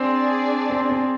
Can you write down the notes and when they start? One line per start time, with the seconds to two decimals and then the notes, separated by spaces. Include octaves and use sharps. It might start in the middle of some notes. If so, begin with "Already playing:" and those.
Already playing: C4 D4 G#4 D5
0.70 C4
0.90 C4